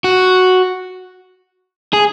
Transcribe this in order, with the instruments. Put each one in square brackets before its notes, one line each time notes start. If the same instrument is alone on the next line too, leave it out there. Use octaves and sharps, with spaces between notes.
[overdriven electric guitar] F#4
G#4